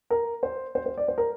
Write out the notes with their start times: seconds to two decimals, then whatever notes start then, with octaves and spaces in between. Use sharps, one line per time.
0.10 A#4
0.43 C5
0.75 C5
0.86 C5
0.98 D5
1.08 C5
1.18 A#4